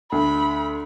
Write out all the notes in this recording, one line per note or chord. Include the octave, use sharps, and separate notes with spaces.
D2 B5